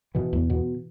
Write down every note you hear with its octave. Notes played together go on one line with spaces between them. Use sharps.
B2 E3
E2
B2